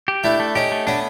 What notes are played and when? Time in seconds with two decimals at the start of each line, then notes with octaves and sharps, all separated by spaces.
0.08 G4
0.24 A3 D4 E4
0.40 A3
0.55 C#4 D#4 G4
0.72 A3
0.87 B3 C#4 D4